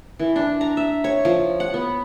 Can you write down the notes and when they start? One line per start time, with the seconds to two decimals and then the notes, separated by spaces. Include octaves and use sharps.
0.19 E3
0.36 D4
0.61 A#5
0.77 E5
1.04 C#5
1.25 F3
1.60 F#5
1.74 B3